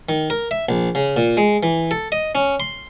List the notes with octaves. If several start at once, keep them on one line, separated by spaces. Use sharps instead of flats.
D#3
A#4
E5
A#1
C#3
A#2
G#3
E3
A4
D#5
C#4
C6